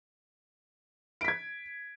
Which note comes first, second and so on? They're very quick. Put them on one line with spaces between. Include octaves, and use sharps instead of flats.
D7 B6 G#6